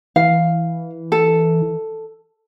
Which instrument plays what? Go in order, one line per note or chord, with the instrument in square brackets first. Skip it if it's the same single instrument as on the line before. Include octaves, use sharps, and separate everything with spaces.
[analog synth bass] E3 [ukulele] F5
[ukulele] A4